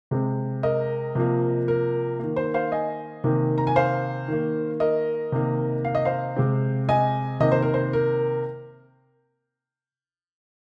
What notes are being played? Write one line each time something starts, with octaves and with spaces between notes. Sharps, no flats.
C3 G#3 C4
A#4 D#5
C3 F3 A#3
A#4
D#3 A#3
C5
C5 F5
D#5 G#5
C3 D#3 A#3
A#5
G#5
C5 F5
D#3 A#3
A#4 D#5
C3 D#3 A#3
F5
D#5
C5 F5
C3 G#3 C4
D#5 G#5
C3 D#3 A#3 D#5
C5
A#4
C5
A#4